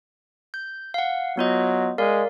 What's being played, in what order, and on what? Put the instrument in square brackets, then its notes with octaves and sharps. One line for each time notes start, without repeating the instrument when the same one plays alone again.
[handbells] G6
F5 F#5
[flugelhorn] F#3 [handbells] B3 F4 D#5
[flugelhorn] G#3 [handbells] A#4 D5 F5